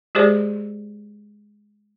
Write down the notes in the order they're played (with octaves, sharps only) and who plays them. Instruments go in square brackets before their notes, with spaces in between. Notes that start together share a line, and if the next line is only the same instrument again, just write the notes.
[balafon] G#3 G4 G#4 C5 D5